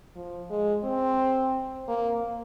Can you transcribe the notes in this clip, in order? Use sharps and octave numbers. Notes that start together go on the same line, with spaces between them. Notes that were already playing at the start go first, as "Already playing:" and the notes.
F3
G#3
C4
A#3